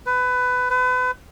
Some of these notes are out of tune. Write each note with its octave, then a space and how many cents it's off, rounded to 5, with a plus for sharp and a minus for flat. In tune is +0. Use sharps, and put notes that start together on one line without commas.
B4 +20
B4 +35